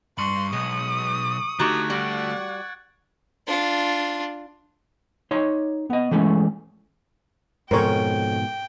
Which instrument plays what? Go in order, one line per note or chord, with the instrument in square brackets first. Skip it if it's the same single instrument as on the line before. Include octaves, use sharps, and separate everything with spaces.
[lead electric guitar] G2 [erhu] C6 [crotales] C#6 C#7 F#7
[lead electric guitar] B1 [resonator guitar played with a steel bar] G#3 [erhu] D#6
[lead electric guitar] D3 A3 [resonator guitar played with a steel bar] D#4 F#4 G4 [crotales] F#6 G#6 A6
[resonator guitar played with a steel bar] G3 F#4 [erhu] F#5 [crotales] D7
[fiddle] D4 F4
[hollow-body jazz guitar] D#4 C#5 C6
B3 D#5
E3 G#3 A3 C#4
[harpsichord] F2 C#4 [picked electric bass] G#2 B2 [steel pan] A#4 C5 C#5 [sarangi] G5